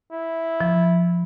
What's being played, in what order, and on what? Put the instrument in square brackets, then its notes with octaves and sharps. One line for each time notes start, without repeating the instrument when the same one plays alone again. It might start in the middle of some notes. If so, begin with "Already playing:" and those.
[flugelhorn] E4
[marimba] F3